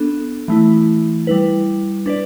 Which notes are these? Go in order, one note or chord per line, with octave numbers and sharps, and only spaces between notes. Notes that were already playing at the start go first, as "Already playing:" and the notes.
Already playing: B3 D4 A4
E3 A3 E4
G3 E4 B4
D4 B4 D5